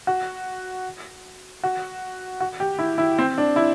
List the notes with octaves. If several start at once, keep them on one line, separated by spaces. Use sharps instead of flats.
F#4
F#4
F#4
G4
E4
E4
C4
D4
E4